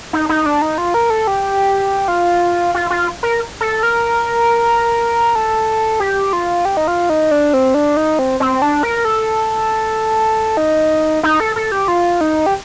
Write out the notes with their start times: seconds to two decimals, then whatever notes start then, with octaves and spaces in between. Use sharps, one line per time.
0.13 D#4
0.29 D#4
0.46 D4
0.62 D#4
0.78 F4
0.94 A#4
1.10 A4
1.27 G4
2.08 F4
2.75 F4
2.90 F4
3.23 A#4
3.61 A4
3.83 A#4
5.35 A4
6.00 G4
6.33 F4
6.65 G4
6.77 D#4
6.88 F4
7.10 D#4
7.31 D4
7.54 C4
7.74 D4
7.97 D#4
8.19 C4
8.40 C4
8.62 D4
8.83 A#4
9.05 A4
10.57 D#4
11.23 D#4
11.40 A4
11.56 A4
11.72 G4
11.88 F4
12.21 D#4
12.46 G4